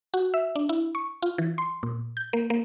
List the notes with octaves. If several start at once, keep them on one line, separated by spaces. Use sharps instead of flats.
F#4
E5
D4
E4
C#6
F4
E3
C6
A#2
G6
A#3
A#3